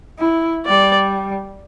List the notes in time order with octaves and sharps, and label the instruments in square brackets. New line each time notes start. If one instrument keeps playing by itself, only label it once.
[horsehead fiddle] E4
[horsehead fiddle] G3 [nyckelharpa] D5